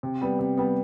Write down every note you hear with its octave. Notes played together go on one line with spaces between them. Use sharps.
C3
G3 B3
C3
G3 B3